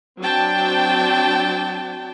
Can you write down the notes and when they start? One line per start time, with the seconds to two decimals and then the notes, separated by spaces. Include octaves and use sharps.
0.20 F#3 C4 D4 G5 A5